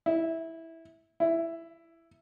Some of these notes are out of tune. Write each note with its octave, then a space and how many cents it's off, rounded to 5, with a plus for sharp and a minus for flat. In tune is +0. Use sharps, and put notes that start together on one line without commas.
E4 -10
E4 +10